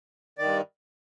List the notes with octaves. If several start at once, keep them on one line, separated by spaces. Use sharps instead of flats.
G2 D#3 D5